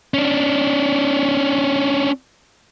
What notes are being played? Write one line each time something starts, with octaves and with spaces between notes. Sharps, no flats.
C#4 D4